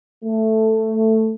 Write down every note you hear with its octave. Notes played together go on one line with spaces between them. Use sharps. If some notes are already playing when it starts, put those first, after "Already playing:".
A3